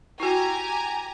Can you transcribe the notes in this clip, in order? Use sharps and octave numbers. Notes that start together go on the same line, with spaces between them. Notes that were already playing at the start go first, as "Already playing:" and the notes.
E4 F#4 G4 G#5 A#5